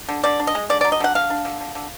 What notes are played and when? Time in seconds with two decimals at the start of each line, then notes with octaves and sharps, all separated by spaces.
0.09 D3
0.24 D3 D5
0.40 D4
0.47 D#5
0.55 G#3
0.70 D3 D5
0.81 D5
0.85 F#3
0.92 D#5
1.00 D3 F#5
1.15 D3 F5
1.30 D4
1.45 D3
1.61 D3
1.75 D3